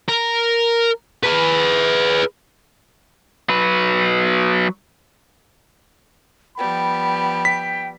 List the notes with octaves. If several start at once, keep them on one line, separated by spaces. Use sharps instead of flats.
A#4
G#4 B4
F#3 B4
F3 G3 B3 G5 B5
G5 B6